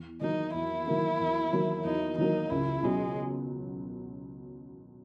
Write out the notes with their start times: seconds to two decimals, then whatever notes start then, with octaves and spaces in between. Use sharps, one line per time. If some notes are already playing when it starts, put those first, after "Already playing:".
Already playing: E2
0.21 D#3 F#3 A#3 D#4
0.54 E2 E4
0.87 D#3 F#3 A#3
1.20 E2
1.53 D#3 F#3 A#3
1.85 E2 D#4
2.18 D#3 F#3 A#3 D#4
2.50 C#2 E4
2.83 B2 F#3 G#3